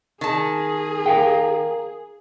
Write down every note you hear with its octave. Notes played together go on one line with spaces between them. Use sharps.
D#3 G#4 A5
A#4 F5 G5